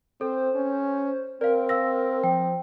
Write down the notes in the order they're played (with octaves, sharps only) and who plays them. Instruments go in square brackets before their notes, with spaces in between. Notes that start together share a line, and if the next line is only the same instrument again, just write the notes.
[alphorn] C4 [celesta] A4 [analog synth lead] C5
[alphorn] C#4
[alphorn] C4 [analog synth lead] A#4 [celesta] D5 F5
[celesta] F5 E6 A#6
[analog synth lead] F3 [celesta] G5